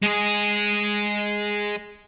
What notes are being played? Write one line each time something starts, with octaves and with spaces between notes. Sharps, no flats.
G#3 G#4